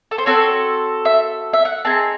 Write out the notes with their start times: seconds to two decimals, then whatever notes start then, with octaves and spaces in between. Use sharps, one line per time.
0.11 A4
0.18 C5
0.26 C4 F#4 A4 C#5
1.05 E5
1.53 E5
1.65 F#5
1.85 C4 D#4 G#4 A5